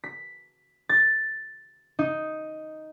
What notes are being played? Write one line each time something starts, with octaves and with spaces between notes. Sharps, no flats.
B6
A6
D#4